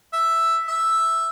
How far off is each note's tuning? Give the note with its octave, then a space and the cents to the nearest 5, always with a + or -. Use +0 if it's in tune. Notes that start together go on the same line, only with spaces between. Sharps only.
E5 +5
E5 +0